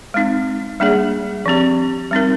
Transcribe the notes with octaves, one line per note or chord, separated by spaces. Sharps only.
G#3 C4 D#4
G3 A#3 D4 G#4 D5
F3 C4 G4
G3 C4 D#4 A#4